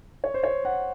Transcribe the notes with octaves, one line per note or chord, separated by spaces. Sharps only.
C#5
C5
C#5
F#5